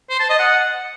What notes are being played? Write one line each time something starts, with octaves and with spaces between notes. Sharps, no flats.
C5
A5
D#5
F#5